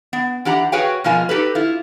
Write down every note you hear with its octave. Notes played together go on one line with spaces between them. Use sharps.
B3
E3 D4 G4 F#5 A#5
F#4 G#4 B4 C#5 F5 G5
B2 F3 G#3 A#3 F4 G#5
D#4 G4 A4 B4
E4 F4